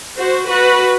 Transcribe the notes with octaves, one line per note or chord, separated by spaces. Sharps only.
F#4 C5
F#4 B4